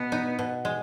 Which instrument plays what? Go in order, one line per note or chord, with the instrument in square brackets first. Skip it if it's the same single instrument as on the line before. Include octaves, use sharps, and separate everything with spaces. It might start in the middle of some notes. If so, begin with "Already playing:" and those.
Already playing: [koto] B2 [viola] B3
[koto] D#4
B2
G#3